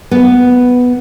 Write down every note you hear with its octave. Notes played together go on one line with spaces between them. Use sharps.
B3